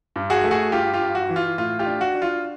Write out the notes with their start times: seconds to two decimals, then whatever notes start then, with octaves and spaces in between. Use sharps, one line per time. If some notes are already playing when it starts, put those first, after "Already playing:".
0.16 G2
0.30 F#4 G#4
0.44 A3
0.51 F#4 G#4
0.72 G2 F4 G4
0.93 F4 G4
1.01 G2
1.15 F#4
1.29 E3
1.36 F4
1.58 A2 F4
1.79 F4 G4
1.86 D4
2.01 F#4
2.15 D4
2.22 F4